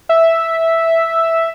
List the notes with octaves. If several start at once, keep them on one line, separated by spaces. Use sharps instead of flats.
E5